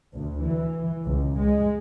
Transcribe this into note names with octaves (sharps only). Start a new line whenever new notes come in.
D2
E3
C#2
G#3